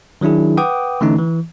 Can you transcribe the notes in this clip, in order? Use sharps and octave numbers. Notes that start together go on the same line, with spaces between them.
D#3 F#3 D4 E4 G#4
B4 F#5 G5 D6 D#6
D3 E3 A3 C#4 D#4
E3